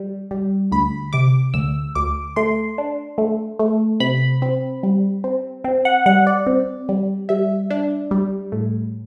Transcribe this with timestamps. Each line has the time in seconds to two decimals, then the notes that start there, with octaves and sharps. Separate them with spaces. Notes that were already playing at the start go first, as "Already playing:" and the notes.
Already playing: G3
0.31 G3
0.72 D2 B5
1.13 C3 D6
1.54 D2 E6
1.95 D2 D6
2.36 A3 C6
2.78 D4
3.18 A3
3.59 A3
4.00 C3 B5
4.42 C4
4.83 G3
5.24 C4
5.64 C4
5.85 F#5
6.06 G3 F#5
6.27 D5
6.47 C4
6.89 G3
7.29 G3 E5
7.70 D4
8.11 G3
8.52 A2